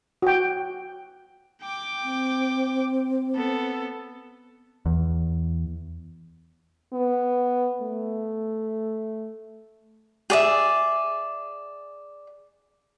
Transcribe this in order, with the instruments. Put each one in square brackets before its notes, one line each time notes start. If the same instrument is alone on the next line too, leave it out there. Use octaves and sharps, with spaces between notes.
[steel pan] F#4 G5
[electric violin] G5 D6
[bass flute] C4
[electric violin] B3 A4
[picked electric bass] E2
[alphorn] B3
A3
[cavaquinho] G#4 D5 E5